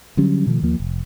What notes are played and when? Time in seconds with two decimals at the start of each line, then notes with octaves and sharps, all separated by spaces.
0.17 D3 F#3 G3 C#4
0.47 B2 D#3 F3 A3
0.63 D#2 F3 A#3
0.80 F1